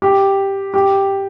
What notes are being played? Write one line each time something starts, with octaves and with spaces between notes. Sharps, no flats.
G4
G4